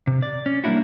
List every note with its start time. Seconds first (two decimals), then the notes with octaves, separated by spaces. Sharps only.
0.07 C3
0.22 D5
0.46 C#4
0.64 G3 A#3 B3 D4 E4 F#4